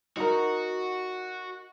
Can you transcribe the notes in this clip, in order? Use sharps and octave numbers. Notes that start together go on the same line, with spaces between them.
D#4 F#4 A#4